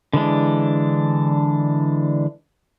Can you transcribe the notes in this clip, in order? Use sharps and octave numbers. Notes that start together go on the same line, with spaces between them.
D3 E3 G#3 D4